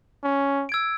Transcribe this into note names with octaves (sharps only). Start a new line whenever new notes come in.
C#4
E6 G#6 D7